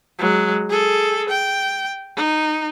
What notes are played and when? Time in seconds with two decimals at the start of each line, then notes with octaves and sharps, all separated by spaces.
0.19 F#3 G#3
0.69 G#4 A4
1.29 G5
2.16 D#4